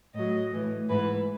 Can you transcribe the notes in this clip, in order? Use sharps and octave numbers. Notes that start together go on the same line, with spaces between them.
A2 F#3 D#5
A2 E3
G#2 E3 B4